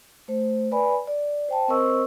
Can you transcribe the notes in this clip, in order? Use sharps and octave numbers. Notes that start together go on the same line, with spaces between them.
A3 C5
B4 D5 G#5 B5
D5
C5 G5 A5
C4 A#4 C5 D#5 C#6 E6